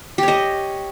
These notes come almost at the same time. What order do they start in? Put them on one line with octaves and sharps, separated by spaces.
G4 C#5 D#5